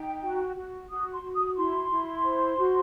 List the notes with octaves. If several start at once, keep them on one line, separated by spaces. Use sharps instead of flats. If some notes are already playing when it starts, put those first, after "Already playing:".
Already playing: D#4 G5
F#4
F#4
F#4 D#6
C6
F#4
D#6
E4 C6
E4
C5
F#4